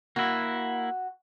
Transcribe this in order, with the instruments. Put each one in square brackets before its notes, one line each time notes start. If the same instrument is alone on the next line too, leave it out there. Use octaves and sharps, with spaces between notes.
[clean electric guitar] A#3 E4 [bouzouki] F#4